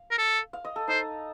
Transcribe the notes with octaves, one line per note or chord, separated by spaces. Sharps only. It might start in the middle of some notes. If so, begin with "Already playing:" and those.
Already playing: F5
A#4
A4
F5
D#5
A4
D#4 C5